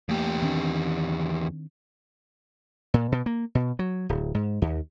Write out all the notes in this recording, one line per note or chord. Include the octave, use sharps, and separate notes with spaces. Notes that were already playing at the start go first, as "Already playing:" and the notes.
E2 A3 A#3 G4
D#3 C4 D4
A#2
B2
A#3
B2
F#3
D1
G#2
D#2